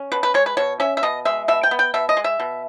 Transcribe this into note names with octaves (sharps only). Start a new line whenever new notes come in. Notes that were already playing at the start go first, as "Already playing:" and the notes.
Already playing: C#4
B2 B4
B4
G#3 C#5
B4
B2 C#5
C#4 E5
E5
B2 D#5
G#3 E5
B2 E5
G5
B3
G5
B2 E5
D#5
G#3
E5
B2